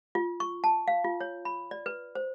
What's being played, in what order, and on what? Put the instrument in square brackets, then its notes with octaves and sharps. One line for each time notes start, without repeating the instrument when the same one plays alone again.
[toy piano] F4
C#6
A5
F5
F4
C#5
B5
D5
B4
C5